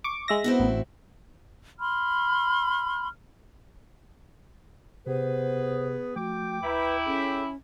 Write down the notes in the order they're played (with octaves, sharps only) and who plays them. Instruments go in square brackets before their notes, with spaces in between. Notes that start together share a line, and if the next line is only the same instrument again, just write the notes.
[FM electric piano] C#6 D6
G#3 E5 A#6
[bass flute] B3 [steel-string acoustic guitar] C4 E4 F#4
[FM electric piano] A1
[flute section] B5 C6 F6
[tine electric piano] C3 G4 [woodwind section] B3 G#4 B4 [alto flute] C5
[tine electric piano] F3 A3 [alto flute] F#4 [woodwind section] G5 D6
[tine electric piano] D2 A#5 [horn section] E4 [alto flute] B4
[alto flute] C#4 [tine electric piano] G#4 A4 C#5